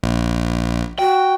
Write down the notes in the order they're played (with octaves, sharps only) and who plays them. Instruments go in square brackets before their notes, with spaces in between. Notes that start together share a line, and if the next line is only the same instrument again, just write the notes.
[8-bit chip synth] A#1
[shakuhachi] F#4 [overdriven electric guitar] G5